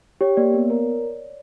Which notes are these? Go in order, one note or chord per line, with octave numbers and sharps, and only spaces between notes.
G4 C#5
A#3 D5
B3
A#4